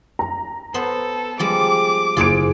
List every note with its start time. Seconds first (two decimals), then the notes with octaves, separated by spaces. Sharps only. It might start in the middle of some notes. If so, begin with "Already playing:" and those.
0.19 A#5
0.74 B3 A4 B4 C5
1.39 F3 G3 G#3 D6
2.17 F#1 F4 G#4 C5 D7